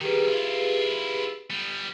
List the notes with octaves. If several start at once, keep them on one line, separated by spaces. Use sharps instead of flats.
D#3 G3 G4 G#4 B4
E4 F4
G3 B3